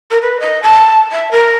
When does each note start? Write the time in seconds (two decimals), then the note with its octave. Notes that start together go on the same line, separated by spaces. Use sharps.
0.10 A#4
0.22 B4
0.39 D#5
0.62 A5
1.11 E5
1.31 A#4